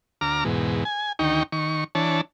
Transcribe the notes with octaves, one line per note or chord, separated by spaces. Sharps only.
D2 A#5 D6 F6
E2 G#2 B2
G#5
D2 D#3 D#4 G5 C#6
D#3 C#6
E3 D4 C#5 A5